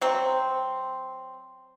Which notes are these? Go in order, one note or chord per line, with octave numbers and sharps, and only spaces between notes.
F#3 C4